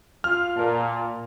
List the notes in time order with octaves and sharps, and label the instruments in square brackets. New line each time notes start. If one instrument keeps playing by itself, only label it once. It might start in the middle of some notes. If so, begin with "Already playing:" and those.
[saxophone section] F4 [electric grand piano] F6
[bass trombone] A#2 [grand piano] A#4 A5